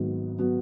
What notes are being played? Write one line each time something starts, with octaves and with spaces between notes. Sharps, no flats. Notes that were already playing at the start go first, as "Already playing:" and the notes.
Already playing: G#1 G#2 F#3 B3 F#4
F#3 B3 F#4